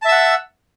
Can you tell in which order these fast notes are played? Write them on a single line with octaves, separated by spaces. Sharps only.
A5 E5 E6 F#5